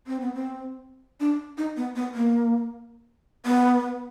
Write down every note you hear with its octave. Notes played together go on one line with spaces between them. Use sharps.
C4
B3
C4
D4
D#4
B3
B3
A#3
B3